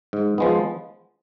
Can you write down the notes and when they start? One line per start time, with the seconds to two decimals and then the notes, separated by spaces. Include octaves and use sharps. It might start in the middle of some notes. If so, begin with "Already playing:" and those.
0.13 G#2
0.38 F3 G#3 B3